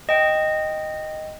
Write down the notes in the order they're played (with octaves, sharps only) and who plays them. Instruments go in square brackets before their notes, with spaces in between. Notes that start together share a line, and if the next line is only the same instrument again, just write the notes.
[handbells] D#5 G5